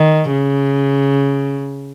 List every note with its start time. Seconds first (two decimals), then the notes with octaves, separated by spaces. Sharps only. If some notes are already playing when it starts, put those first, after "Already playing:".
Already playing: D#3
0.32 C#3